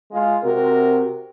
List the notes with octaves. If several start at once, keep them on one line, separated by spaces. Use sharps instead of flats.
G#3 F4
C3 F#4 A#4